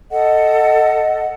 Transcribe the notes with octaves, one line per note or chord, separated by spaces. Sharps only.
A4 D#5 F#5